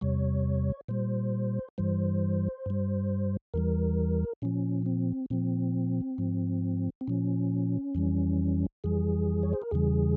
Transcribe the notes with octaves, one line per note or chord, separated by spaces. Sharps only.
E2 C3 G3 C#5
A#2 G3 C5
G2 E3 G3 C5
G2 G3
E2 E3 G3 A#4
A#2 F3 C#4
C4
A#2 F3 C4
G#2 F3
C4
A#2 F3 C#4
F2 E3 G3
F2 E3 G3 G#4
C#5
C5
A#4
E2 C#3 E3 G3 G#4